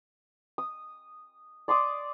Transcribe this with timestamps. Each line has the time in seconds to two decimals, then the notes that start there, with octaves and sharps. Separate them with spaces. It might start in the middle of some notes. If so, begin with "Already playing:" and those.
0.58 D#6
1.68 D5 C6 D6 D#6